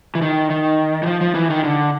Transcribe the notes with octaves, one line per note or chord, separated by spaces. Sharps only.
E3
D#3
D#3
E3
F3
F3
E3
D#3
D3